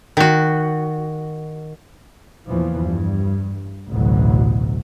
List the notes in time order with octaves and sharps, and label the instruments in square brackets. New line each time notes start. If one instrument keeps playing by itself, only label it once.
[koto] D#3 F#4
[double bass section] E2 A#2 E3 F3
G2
A1 D2 B2 F#3